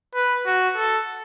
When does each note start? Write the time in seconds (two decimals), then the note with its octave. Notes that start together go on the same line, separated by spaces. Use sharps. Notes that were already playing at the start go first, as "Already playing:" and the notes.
0.15 B4
0.46 F#4
0.77 A4